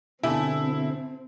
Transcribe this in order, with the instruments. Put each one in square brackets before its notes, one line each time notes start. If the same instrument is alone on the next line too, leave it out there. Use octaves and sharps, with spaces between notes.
[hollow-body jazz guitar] B2 D3 [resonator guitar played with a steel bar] A3 G4 G#5 [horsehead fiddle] C4 [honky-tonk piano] E4